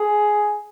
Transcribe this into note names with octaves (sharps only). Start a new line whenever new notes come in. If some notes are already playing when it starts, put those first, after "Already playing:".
Already playing: G#4